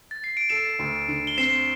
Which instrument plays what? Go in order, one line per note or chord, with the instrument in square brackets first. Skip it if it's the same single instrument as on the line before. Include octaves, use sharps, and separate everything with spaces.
[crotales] A6
C7
D7
[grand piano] A4 [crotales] C7 E7
[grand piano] D2
D3
[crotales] G7
[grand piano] C4 [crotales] C7 E7